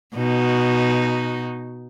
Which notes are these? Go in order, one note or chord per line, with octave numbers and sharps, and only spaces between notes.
B2 D#4 F#4